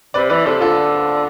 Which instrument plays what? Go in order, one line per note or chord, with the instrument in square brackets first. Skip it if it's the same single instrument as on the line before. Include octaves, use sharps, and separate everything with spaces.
[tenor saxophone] C3 [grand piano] B4 D5
[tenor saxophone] E3 [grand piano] B4 D5
[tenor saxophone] C3 [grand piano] A4 C5
[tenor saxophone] D3 [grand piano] F4 A4